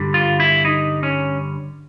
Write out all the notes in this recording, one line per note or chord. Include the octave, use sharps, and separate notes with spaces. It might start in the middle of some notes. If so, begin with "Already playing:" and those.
Already playing: G2 D3 G3
F4
E4
D#4
C#4